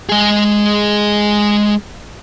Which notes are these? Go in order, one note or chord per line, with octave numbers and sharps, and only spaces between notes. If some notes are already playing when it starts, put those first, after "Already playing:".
G#3 G#4